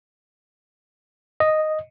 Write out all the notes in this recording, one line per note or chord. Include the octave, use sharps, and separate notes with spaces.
D#5